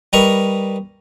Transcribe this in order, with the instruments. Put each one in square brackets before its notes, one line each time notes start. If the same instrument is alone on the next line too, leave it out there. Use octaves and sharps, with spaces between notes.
[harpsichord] G3 A#4 B4 D#5 A#5 C#6